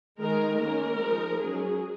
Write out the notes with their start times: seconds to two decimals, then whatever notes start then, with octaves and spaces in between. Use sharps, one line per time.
0.19 D#3 G#3 D#4 A#4
0.59 D#3 A#3 C#4 A#4
0.99 F3 G#3 D#4
1.39 F#3 C#4 G#4